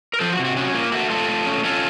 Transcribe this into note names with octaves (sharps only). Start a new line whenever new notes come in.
A#4
F3 A4 C5
F#4
C3
F#4
C#4 F#4
A#3 F4
A3 F#4
A3 F4 A4
A3
C#4
C#4 F4 A4